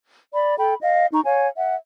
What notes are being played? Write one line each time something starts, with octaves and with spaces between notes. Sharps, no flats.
D5 B5
A4 G5 B5
D#5 F5
D#4 A#5 C#6
C#5 F5 G#5
E5 F#5